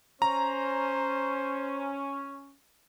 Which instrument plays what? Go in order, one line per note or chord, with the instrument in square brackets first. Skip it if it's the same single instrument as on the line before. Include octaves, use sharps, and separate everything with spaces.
[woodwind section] C#4 [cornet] C5 [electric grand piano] A#5